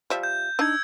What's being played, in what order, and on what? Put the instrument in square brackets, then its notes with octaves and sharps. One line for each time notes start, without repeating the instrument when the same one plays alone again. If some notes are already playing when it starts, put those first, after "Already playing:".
[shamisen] F3 G3 E5
[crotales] G6
[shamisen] D4 D#4 [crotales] E6 G#6